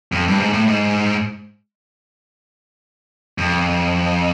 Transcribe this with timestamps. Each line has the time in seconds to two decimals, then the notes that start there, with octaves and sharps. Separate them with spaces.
0.12 F2
0.28 G2
0.39 G#2
0.53 A2
0.66 G#2
3.38 F2